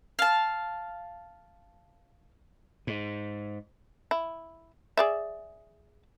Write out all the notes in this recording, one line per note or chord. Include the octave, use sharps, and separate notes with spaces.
F5 A5
G#2
E4
G#4 D5 E5